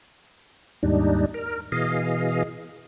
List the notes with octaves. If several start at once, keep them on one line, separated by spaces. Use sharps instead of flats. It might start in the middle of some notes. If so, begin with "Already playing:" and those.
D#2 G#2 G3 D4 D#4
A#4
B2 E3 G#4 D#5 F5